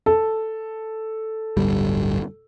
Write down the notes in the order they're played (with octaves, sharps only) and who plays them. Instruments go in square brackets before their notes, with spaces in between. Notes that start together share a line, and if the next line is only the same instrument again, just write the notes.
[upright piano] A4
[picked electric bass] D1 G1 G3